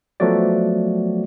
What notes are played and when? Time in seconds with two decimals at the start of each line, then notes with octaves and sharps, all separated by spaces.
0.20 F3 F#3 A3 B3 F#4 D5